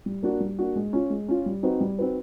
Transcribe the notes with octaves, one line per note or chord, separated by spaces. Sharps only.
G3
A#3 D4 F#4
G3
A#3 D4 F#4
G#3
C#4 F4
G#3
C#4 F4
G3
C4 D#4 F#4 B4
G3
C4 D#4 F#4 B4